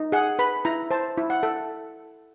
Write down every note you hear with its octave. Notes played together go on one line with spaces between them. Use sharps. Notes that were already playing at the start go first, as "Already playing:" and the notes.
Already playing: D#4
G#4 F#5
B4 B5
E4 A#5
C5 A5
E4
F#5
A4